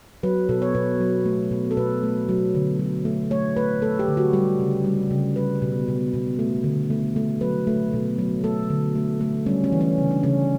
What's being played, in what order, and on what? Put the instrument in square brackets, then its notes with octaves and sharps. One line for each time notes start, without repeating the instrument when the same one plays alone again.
[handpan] F#3 B4
B2 A4
C#5
B2 B4
F#3
A3
B2
A4
B2 B4
A3
F#3
D3
F#3
A3
A3 C#5
A3 B4
A3 A4
G4
D3
F#4
G3 G4
C#3
G3
C#3
G3 B4
B2
B2
B2
A3
D3
A3
A3
F#3 B4
A3
B2
F#3
A3 A4
D3
A3
A3
G3 C#4
C#4
E3
C#4
C#3
D4
C#3 C#4